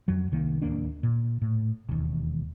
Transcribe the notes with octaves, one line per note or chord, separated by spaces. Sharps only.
F2 F#3
C2 D#3 A#3
D1 D#2 A#3 D4
A#2
A2
E1 D#2